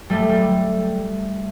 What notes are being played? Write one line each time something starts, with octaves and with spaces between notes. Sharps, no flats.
G3 A3
G3